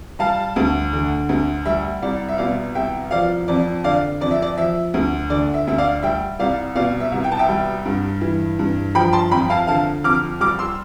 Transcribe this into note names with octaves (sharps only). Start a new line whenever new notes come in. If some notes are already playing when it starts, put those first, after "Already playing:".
G3 F5 A5
D2
D3
D2
G3 E5
C2 D5
E5
B2 D5 F5
C2 E5 G5
F3 D5 F5
F2 D5
D3 D5 F5
F2 D5
E5
D5
F3 E5
D2
D3 D5
E5
D2 E5
D5 F5
G3 E5 G5
C2 D5 F5
B2 D5 F5
E5
C2
G5
A5
E5 G5
G3
G2
E3
G2
F3 G5 B5
A5 C6
F2 G5 B5
F5 A5
D3 F5 A5
F2 D6 F6
G3 D6 F6
C6 E6